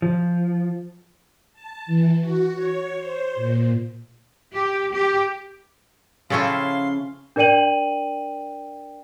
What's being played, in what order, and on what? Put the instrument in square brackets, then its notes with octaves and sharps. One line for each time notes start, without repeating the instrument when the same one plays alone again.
[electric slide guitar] F3
[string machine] A5
E3
F#4
C#5
C5
A#2
[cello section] G4
G4
[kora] C#3 A4 G5 [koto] F3 C#4 E4 [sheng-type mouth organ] F5 C6
[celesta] D4 A#4 D5 G5 D#7 F#7